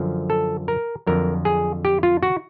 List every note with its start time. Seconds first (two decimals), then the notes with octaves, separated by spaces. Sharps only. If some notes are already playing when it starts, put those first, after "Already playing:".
Already playing: F#2 D3 F3
0.30 A4
0.68 A#4
1.07 F2 D3 F#3 A#4
1.45 G#4
1.85 G4
2.03 F4
2.23 F#4